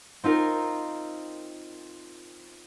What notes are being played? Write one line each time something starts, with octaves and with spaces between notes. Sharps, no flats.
C4 D#4 F4 A#4